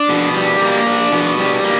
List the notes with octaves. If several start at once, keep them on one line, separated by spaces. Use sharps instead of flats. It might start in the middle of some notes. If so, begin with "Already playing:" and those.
Already playing: D4
B2
G3
A#3
D4
B2
G3
A#3